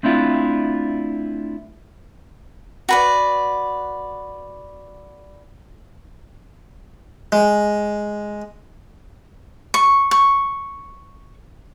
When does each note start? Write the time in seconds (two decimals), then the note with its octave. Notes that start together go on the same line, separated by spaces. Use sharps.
0.03 A3 C4 D4 E4 F4
2.89 F#4 B4 D5
7.32 G#3
9.74 C#6
10.11 C#6